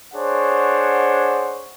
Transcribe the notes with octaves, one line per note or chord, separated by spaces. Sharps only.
D4 G#4 C5 C#5 F#5